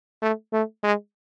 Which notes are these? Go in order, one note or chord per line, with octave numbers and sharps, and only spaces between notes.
A3
A3
G#3